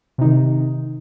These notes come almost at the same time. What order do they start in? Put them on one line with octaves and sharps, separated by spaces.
C3 D#4 D#3